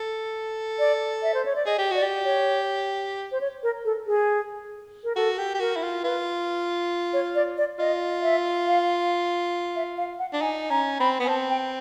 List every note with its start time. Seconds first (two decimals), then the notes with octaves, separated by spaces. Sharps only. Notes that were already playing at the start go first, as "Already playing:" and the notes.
Already playing: A4
0.79 D5
1.23 E5
1.34 C5
1.45 C#5
1.56 D5
1.66 G#4 D#5
1.78 G4
1.91 F#4 D5
2.02 G4
2.25 C#5
3.32 C5
3.41 C#5
3.63 A#4
3.85 A4
4.07 G#4
5.04 A#4
5.16 F#4 A4
5.38 G4
5.54 G4
5.60 F#4 A#4
5.76 E4
5.83 F4
6.03 F4 B4
7.13 C#5
7.35 D5
7.57 D5
7.79 F4 D#5
8.22 E5
8.66 F5
9.76 E5
9.97 F5
10.19 F#5
10.33 D4
10.41 D#4 G#5
10.71 C#4 A#5
11.00 C4 B5
11.19 B3
11.25 G#5
11.28 C4 A5
11.50 G5